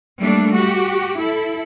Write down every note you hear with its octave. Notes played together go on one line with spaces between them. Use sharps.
G3 A3 A#3 D4
F#4 G4
E4 A4